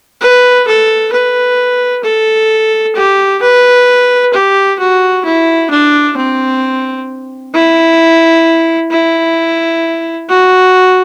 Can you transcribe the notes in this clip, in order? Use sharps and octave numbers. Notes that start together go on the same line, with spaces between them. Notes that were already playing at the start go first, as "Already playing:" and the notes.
B4
A4
B4
A4
G4
B4
G4
F#4
E4
D4
C4
E4
E4
F#4